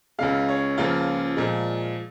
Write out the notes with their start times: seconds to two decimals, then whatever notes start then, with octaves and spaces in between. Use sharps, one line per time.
0.18 C#2 C#3 G#3 F5
0.49 C#5
0.78 C#2 C#3 F3 A#3 F4
1.37 A#2 F3 G#3